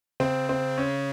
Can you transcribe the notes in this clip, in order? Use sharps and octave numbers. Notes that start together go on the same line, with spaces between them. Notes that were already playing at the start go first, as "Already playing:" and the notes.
C#3 C4
C4
C#4